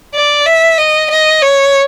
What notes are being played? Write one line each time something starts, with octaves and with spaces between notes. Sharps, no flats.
D5
E5
D#5
D#5
C#5